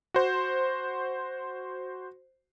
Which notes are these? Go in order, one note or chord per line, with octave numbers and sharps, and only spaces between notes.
F#4 C5